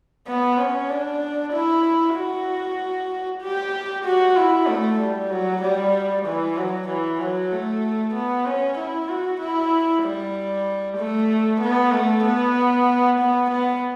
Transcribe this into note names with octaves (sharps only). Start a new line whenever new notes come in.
B3
C#4
D4
E4
F#4
G4
F#4
E4
A3
G3
F#3
G3
E3
F#3
E3
F#3
A3
B3
C#4
E4
F#4
E4
G3
A3
B3
A3
B3
B3
B3